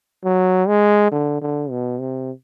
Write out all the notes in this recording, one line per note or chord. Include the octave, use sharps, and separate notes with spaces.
F#3
G#3
D3
D3
B2
C3